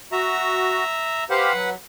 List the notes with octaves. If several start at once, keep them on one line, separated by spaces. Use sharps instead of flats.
F#4 E5 A#5
G4 B4 C5 F5 F#5
F#3